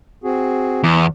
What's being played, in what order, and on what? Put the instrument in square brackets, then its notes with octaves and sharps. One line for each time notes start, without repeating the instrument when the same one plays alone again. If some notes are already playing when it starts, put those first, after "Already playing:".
[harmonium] C4 F#4 G#4
[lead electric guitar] E2